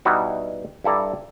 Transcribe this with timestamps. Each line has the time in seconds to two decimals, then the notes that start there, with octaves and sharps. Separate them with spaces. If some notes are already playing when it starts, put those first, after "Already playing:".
0.05 B2 G3 D#4 E4 F#4
0.84 G2 E4 A4 D5 A#5